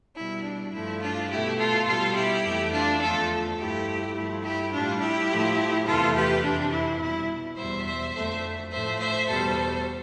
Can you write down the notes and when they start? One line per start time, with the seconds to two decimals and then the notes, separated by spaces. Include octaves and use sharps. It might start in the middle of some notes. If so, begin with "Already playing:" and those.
0.16 B2 G3 E4
0.44 D4
0.73 G2 F3 A3 E4
1.01 D4 F4
1.30 B2 A3 E4 G4
1.58 F4 A4
1.87 B2 G3 F4 A4
2.15 E4 G4
2.44 F2 E3 A3
2.72 D4 F4
3.01 E2 D3 F3 A3 F4 A4
3.58 G2 F3 A3 E4 G4
4.15 G2 F3 A3 E4
4.43 E4 G4
4.71 A2 G3 D4 F4
5.00 E4 G4
5.29 A2 F3 A3
5.85 E2 C3 E3 A3 F4 A4
6.15 G4 B4
6.43 F2 C3 E3 D4
6.72 E4
7.00 B2 G3 E4
7.57 E2 B2 G3 C5 E5
7.86 C5 E5
8.14 F2 D3 A3 C5 E5
8.71 A2 F3 A3 C5 E5
8.99 C5 E5
9.28 E2 B2 G3 A4 C5